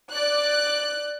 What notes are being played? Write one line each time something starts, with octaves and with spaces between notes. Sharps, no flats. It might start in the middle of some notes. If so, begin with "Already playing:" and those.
D5 F#6